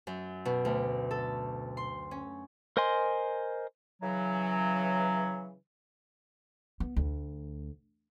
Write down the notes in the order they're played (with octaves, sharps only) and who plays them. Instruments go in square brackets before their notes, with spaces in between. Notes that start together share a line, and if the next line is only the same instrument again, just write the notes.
[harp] F#2
B2
D2
A4
C6
C#4
[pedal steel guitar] A#4 C5 D#5 G#5 C6
[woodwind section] C#3 E3 F#3
[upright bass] B3
D2